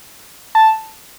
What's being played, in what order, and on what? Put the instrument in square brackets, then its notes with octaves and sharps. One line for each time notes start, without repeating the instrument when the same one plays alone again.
[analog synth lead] A5